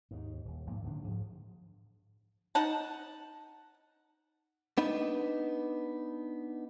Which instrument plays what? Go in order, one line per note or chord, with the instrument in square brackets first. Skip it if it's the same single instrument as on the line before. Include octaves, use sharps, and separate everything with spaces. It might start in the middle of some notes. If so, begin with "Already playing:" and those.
[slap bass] D#2 G#2
D#1
B1 G#2 F3 A#3
D1 D3 D#3 D4
G#2 F3
[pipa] D#4 F#5 A5
[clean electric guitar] B3 D4 D#4 B4